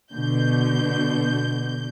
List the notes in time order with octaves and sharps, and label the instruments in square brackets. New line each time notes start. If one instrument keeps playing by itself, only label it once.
[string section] B2 D3 G6